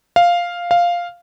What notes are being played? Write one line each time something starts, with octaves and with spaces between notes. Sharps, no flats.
F5
F5